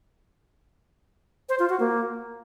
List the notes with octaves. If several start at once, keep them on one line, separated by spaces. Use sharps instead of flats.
C5
F4
F#4
A#3